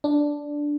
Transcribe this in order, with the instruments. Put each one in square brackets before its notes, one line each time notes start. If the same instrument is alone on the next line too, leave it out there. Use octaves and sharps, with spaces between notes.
[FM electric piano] D4